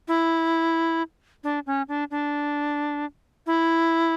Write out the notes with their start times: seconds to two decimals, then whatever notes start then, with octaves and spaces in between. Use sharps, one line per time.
0.08 E4
1.44 D4
1.67 C#4
1.88 D4
2.11 D4
3.46 E4